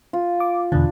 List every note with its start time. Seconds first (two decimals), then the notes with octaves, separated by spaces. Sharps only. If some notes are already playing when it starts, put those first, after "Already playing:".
0.13 F4
0.40 D6
0.72 E2 B2 D3 D4